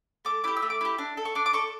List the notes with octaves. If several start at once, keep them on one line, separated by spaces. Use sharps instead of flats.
A3 D6
E4 G4 D6
E6
A3
D6
E4 G4
D4
A4
C#6
D4 D6
D6
A4 C#6